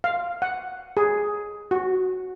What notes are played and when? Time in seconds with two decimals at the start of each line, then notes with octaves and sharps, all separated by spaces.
0.04 F5
0.42 F#5
0.97 G#4
1.71 F#4